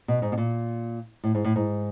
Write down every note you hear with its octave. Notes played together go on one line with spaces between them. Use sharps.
B2
G#2
B2
A#2
A2
G#2
A2
G#2